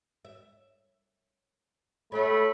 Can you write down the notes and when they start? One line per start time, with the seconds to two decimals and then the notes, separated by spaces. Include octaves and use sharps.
0.25 E5
2.12 A3 F4 G4 C#5 B5